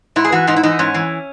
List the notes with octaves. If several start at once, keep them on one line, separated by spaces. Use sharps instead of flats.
G#2 E4
G#4
E3 F#4
G#2 D#4
E4
E3 D#4
G#2 C#4
E3